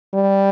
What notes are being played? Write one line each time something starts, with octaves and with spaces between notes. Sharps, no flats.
G3